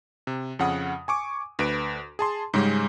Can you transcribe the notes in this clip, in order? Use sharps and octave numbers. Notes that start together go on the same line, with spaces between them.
C3
F2 C#3 F#5 D#6
G#5 C#6 D6
D2 B4 D7
G#4 A5 C6
G#2 C#3 G3 G#3 C#4